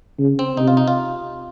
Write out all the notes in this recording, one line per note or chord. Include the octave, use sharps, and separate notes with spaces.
C#3
C4
C3 D#4
F4
D#4
F4